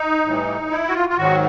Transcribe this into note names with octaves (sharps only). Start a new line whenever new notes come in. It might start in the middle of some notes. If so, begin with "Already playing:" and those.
Already playing: D#4
A2 E3 G3
E4
F#4
F4
F4
G#2 D#3 F#3 F#4